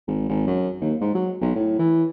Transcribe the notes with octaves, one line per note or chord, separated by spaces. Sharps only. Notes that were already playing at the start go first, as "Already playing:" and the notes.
G#1
G#1
F#2
D#2
G#2
F#3
B1
A2
E3